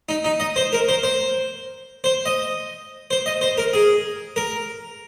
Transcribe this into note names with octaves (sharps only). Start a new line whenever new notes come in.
D#4
D#4
D#5
C5
A#4
C5
C5
C5
D#5
C5
D#5
C5
A#4
G#4
A#4